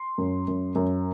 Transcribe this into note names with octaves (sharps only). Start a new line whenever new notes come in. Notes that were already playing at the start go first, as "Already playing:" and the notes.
Already playing: C6
F#2
F#2
F#2